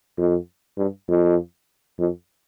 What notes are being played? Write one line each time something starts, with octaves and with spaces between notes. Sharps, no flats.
F2
G2
F2
F2